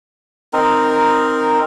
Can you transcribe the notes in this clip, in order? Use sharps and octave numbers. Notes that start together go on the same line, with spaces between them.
C4 D#4 A#4